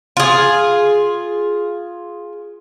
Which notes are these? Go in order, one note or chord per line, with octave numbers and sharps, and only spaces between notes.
F4 G#4